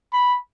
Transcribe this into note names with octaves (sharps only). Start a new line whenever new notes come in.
B5